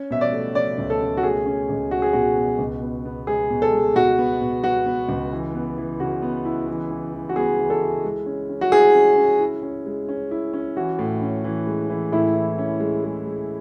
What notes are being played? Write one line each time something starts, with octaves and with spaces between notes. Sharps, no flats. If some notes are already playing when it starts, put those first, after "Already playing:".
Already playing: C#4
B2 E5
D5
A3
C#4 D5
C#2
A4
C#4
F#4
A3 G#4
C#4
C#2
C#4 F#4
G#4
B2 F#4
B2
C#2
B3
B3
G#3 G#4
B2
A4
G#3
B2 F#4
B3
B2
B3 F#4
B3
C#2
E3
B3
E3
C#3 F#4
B3
E4
E3
E3
E3
F#4
B3 G#4
E3
A4
E4
G#3
C#4
C#4
F#4
E4 G#4
C#4
C#4
E4
C#4
G#3
C#4
E4
C#4
E3 F#4
A2
C#4
E3
G#3
E3
A2 E4
E3
C#4
G#3
G#3
G#3